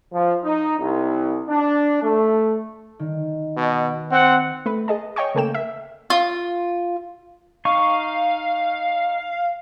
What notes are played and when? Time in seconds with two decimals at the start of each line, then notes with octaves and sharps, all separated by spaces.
0.13 F3
0.43 D#4
0.79 C2
1.49 D4
2.03 A3
2.99 D#3
3.57 B2
4.11 C4 F#5
4.66 A3 B4
4.88 G#4 D#5 A5
5.16 C#5 D#5 G5 G#5 C#6
5.35 C#3 A3 A#3 G5 E7
5.54 E5
6.10 F4
7.65 D#4 F5 C#6